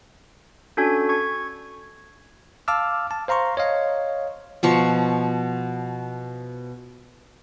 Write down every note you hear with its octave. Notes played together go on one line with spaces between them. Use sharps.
C#4 D4 F#4 A4 G#5 G#6
C#6 G#6
F5 A5 D6 E6 F6
A5
C5 F5 A#5 C6 C#6
C#5 D#5 F5
B2 F3 C#6